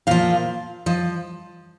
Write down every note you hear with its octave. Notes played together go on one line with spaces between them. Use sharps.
A#2 F3 F5
F3 D#5